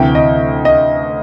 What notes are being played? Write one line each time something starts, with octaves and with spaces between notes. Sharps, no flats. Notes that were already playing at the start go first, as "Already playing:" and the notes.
Already playing: D2 C3 E3 G5
D#5
D#5